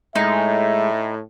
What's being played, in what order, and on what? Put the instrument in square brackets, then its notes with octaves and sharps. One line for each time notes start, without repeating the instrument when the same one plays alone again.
[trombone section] A2 [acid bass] G#3 [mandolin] D#4 [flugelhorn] E5